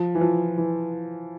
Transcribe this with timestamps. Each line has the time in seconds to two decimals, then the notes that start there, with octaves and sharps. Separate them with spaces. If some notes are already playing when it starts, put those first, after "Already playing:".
Already playing: F3
0.15 E3
0.21 F3
0.58 E3